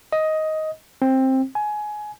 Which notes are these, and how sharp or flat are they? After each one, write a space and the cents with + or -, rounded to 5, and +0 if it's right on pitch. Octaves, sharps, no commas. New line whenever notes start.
D#5 +10
C4 +15
G#5 +20